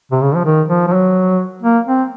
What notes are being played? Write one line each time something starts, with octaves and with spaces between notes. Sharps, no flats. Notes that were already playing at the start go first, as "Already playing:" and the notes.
C3
C#3
F3
D#3
F3
F3
F#3
A#3
C4